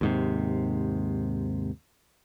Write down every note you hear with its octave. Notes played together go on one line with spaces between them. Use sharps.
D#2 G#2 C3